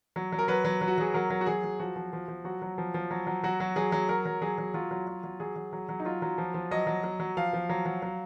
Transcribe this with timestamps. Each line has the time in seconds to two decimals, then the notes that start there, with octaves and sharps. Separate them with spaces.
0.16 F#3
0.32 F#3
0.39 A#4
0.48 F#3 B4
0.65 F#3
0.81 F#3
0.88 F#4
0.98 F#3 G#4
1.14 F#3 A#4
1.30 F#3
1.41 F#4
1.46 F#3 G#4
1.64 F#3
1.79 F3 F#4
1.96 F3
2.13 F3
2.28 F3
2.45 F#3 F#4
2.62 F#3
2.78 F3
2.94 F3
3.11 F#3
3.27 F#3
3.43 F#3 F#4
3.60 F#3
3.76 F#3 G#4
3.92 F#3
4.09 F#3 A#4
4.25 F#3
4.42 F#3 G#4
4.58 F#3
4.74 F#3 F4
4.91 F#3
5.07 F#3
5.23 F#3
5.40 F#3 G#4
5.56 F#3
5.73 F#3
5.89 F#3
6.00 D#4
6.05 F#3 F4
6.22 F#3
6.38 F3
6.54 F3
6.71 F#3 D#5
6.87 F#3
7.04 F#3
7.20 F#3
7.37 F3 F5
7.53 F3
7.69 F#3
7.85 F#3
8.02 F#3